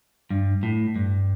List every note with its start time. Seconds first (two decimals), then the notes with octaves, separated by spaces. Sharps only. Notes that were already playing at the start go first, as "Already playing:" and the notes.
0.31 G2
0.63 A2
0.96 G2